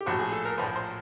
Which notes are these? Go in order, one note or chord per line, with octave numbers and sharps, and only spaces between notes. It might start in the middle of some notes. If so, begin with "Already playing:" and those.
G4
A#1 A2 F3 F#4
G#4
A4
A#4
A#1 A2 F3 B4
C5